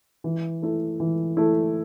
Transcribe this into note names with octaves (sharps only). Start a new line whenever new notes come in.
E3
A3 E4
E3
A3 E4